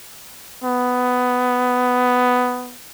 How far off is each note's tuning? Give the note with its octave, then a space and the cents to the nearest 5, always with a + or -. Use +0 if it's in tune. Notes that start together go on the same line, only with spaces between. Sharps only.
B3 +10